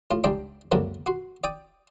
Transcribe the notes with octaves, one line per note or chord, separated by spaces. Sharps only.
A2 F4
C#2 G#2 G3 D4 G5 C6
C#2 F#2 D3 A#3 C4
F#4 C6
D5 G5 D#6